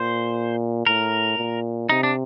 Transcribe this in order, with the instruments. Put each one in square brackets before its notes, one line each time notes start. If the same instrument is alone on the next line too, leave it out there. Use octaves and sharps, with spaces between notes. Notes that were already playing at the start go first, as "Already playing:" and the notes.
Already playing: [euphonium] A#2 [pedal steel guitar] C5
[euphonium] A2 [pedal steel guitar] A#4
[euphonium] A#2
[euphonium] C3 [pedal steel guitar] D#4
[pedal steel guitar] D4